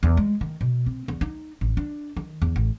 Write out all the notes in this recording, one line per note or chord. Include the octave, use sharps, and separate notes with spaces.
E2
G#3
D#3
B2
C4
E2
D#4
A1
D4
D#3
E2
A1